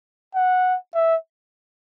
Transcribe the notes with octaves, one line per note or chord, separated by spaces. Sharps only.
F#5
E5